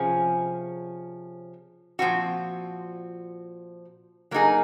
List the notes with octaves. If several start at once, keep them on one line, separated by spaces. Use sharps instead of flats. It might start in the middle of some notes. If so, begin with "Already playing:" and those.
Already playing: C3 F3 C#4 G#4
A#2 F3 C4 F#4
F#3 A#3 D#4 G#4